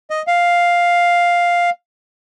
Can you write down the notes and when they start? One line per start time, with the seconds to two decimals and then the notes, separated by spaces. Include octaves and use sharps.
0.10 D#5
0.27 F5